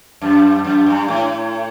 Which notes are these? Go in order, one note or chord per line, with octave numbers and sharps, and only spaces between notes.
F#2
F#2
G2
A2